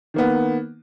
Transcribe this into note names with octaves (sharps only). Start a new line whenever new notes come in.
D#3 A#3 B3